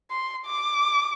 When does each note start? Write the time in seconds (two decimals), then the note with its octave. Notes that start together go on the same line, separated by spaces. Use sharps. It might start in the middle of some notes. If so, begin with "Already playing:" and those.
0.11 C6
0.46 D6